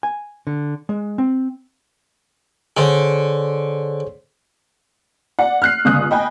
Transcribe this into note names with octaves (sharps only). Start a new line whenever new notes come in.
G#5
D3
G#3
C4
D3 G#4 C5 C#5
D5 F#5
F6 F#6 C7
G1 C#2 D#6 F6 F#6
D#5 G5 G#5 B5